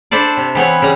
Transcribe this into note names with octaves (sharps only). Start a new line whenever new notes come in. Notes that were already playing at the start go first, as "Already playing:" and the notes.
D4 E4 A4 C5 D5
C3
E3 B3 C4 C#5
C#3 G3 A#5